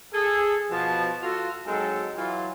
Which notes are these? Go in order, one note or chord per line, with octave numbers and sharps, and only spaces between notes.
G#4 A4
B2 F3 A5
F4 F#4 A4
G#2 F#3 G#3 C4 A4
E3 F#3 E4 F4